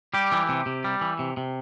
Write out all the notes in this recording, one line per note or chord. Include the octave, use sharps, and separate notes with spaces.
G3 G4
E3
C3
C3
G3
E3
C3
C3